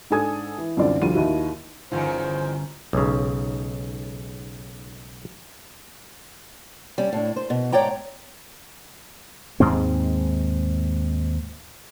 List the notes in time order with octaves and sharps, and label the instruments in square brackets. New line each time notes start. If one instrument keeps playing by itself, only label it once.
[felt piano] G#2 D4 A4 G#5 D#6 G#6
E3
C2 F#2 D3 C4 F4 D5
F1 D2 G3 F4 D#7
D#2 D#4 E4 F#4
[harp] G1 C#4 [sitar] E2 D#3 [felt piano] F4 [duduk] C5
[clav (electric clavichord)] B1 G#2 C#3
[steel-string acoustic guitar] G3 C#4
A2 D4
C5
B2
G#2 C#5 D5 G5 A#5
[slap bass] D#2 G#2 G#3 C4